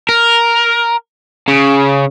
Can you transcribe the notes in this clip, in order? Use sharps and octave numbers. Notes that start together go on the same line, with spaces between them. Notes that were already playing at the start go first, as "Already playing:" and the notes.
A#4
C#3